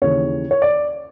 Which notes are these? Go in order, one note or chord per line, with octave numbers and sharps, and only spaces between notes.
D#2 C#3 E3 C#5
C#5
D5